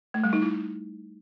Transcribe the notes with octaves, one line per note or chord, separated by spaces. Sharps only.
A3
G3
D#4
E4